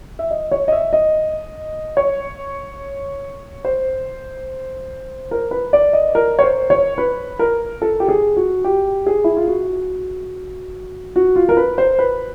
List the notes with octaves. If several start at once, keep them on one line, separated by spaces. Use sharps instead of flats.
E5
D#5
C#5
D#5
E5
D#5
C#5
C5
A#4
B4
D5
D#5
A#4
C#5
C5
C#5
B4
A#4
A4
G4
G#4
F#4
G4
G#4
E4
F4
F#4
F#4
F4
A#4
B4
C5
B4